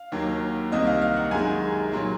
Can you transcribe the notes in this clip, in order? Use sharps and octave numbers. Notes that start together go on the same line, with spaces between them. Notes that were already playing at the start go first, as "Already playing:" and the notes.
Already playing: F5
D#2 D#3 F#3 A#3
C2 C3 D#3 A#3 D#5
F5
F5
F#5
F#2 D#3 G#3 G#5
A#2 F#3 A#3